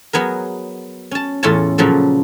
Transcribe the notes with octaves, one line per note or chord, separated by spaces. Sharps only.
F#3 B3 G#4 A#4
C#4 A5
E2 A2 C#4 F4 C#5 A5
A#2 C#3 F3 F#3 A4